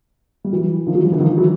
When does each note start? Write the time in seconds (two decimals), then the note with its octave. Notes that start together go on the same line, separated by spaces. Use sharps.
0.44 G3
0.53 E3 F#3
0.87 D#3 F3
0.95 E3 F#3
1.03 F3 G3
1.12 D3 E3
1.20 D#3 F3
1.37 E3 F#3